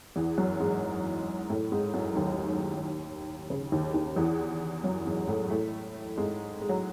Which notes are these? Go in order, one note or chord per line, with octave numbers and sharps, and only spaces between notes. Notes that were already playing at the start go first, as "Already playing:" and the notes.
E2 E3
F#2 F#3
G#2 G#3
A2 A3
G#2 G#3
F#2 F#3
D#2 D#3
C#3
D#2 D#3
D#2 D#3
E2 E3
F#2 F#3
G#2 G#3
A2 A3
A2 A3
G#2 G#3
G#3
F#3